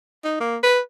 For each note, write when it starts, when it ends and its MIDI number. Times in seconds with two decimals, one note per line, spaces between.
0.25 0.36 63
0.40 0.57 58
0.63 0.80 71